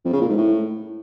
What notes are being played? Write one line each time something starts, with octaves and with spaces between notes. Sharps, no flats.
F2
C#3
A#2
G#2
A2